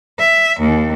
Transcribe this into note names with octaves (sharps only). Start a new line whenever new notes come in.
E5
D#2